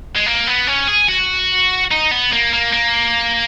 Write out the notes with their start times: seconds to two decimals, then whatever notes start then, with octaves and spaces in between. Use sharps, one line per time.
0.16 G#3
0.26 A#3
0.48 B3
0.67 C#4
0.88 G#4
1.09 F#4
1.91 D#4
2.11 B3
2.33 A#3
2.53 A#3
2.73 A#3